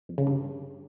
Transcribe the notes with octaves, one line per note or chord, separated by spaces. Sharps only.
F2
C#3
G2